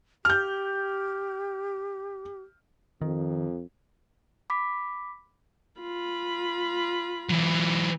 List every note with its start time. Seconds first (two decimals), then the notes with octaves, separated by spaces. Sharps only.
0.25 G4 F6 G6
3.01 F2 D#3
4.50 B5 D6 B6
5.81 F4 B5
7.30 E3 F#3